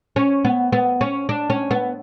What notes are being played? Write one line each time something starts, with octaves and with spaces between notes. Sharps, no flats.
C#4
B3
B3
C#4
D4
C#4
B3